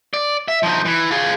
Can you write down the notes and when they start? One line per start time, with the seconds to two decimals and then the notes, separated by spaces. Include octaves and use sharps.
0.14 D5
0.48 E5
0.63 F3 D#4
0.85 E3
1.11 F4 G#4